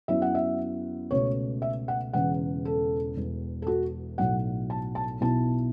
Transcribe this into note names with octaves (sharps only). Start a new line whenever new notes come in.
F#2 F#3 B3 E4 E5
F#5
E5
C#2 B2 A3 C#5
E5
F#5
E1 E2 C#3 F#5
A4
E1 E2 E3
A4
F#4
B1 A2 F#3 A3 F#5
A5
A5
B1 B2 B3 E4 A5